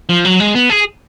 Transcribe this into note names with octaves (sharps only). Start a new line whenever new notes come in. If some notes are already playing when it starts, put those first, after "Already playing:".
F3
F#3
G#3
B3
G#4